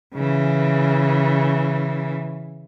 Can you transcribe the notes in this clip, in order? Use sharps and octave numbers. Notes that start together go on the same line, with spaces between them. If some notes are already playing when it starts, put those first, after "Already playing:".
C#3 E3